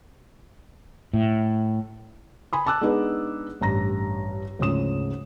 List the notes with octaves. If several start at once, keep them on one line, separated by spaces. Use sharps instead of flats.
A2
G#5 B5 D#6
A5 D6 E6 F#6
G#3 B3 D4 D#4 G#4 B4
A1 G2 A#5 A#6
D2 G#2 C#3 F3 D#6 E7